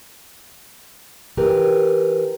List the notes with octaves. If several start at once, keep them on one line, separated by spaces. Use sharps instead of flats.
E3 G4 A#4 B4